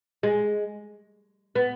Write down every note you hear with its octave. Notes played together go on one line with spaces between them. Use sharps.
G#3
B3